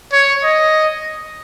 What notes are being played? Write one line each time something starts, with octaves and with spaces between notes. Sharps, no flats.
C#5
D#5